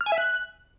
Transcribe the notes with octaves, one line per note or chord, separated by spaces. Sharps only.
F6
G#5
E5
F#6